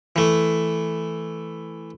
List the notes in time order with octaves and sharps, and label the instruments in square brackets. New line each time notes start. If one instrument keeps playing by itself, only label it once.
[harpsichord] E3 A3